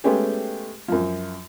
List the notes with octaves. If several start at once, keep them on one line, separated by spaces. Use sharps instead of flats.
G#3 A3 B3 C#4 G4 G#4
F#2 F3